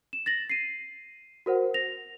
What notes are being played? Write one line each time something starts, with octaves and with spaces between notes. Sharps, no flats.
E7
A6 A#6 F#7
C7 D#7
F#4 A#4 C5 F#5
A#6 F7